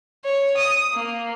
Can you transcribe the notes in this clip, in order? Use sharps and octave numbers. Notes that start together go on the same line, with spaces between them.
C#5
D#6
A#3